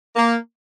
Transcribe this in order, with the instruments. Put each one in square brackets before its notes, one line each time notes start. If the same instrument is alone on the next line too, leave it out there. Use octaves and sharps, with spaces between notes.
[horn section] A#3